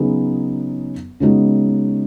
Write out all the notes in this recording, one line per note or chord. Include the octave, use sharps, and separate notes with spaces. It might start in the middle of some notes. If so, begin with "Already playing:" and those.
Already playing: C#3 F#3 B3 D#4 G#4
C#3 G#3 B3 D#4 F#4